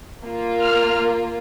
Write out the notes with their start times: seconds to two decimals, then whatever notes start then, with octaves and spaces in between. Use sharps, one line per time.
0.24 A#3 F4
0.61 F6